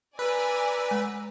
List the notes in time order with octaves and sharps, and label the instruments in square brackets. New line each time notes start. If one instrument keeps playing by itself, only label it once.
[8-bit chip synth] B4 [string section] D5 G#5 A#5 [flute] E6
[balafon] G#3